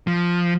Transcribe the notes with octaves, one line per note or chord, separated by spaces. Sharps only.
F3